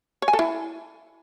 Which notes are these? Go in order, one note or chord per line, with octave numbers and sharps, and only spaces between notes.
C#5
G#5
A4
E4